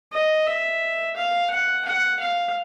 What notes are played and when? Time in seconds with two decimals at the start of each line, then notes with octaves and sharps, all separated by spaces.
0.12 D#5
0.46 E5
1.16 F5
1.51 F#5
1.85 F#5
2.19 F5